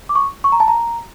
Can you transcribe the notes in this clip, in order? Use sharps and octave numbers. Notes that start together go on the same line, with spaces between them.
D6
C#6
C#6
A#5
A5
A#5